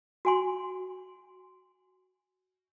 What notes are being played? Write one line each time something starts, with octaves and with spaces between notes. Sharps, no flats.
F#4 G#5 C6